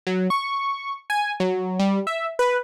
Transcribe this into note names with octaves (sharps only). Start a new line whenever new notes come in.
F#3
C#6
G#5
F#3
G3
E5
B4